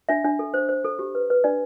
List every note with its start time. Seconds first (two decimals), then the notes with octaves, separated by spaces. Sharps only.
0.09 D4 E5
0.25 D4
0.39 A4
0.54 C5
0.69 C5
0.85 A4
0.99 G4
1.15 B4
1.30 B4
1.44 D4 D5